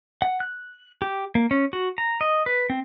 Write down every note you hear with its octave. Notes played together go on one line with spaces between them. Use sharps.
F#5
F#6
G4
A#3
C#4
F#4
A#5
D#5
B4
C4